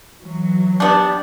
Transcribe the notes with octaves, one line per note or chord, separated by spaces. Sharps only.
E3 F#3
B3 D4 G4 D5 A5